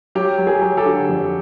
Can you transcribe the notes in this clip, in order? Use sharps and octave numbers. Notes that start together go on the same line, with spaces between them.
F#3 G4
F#3
G#4
F#3
G4 A4
D3
F2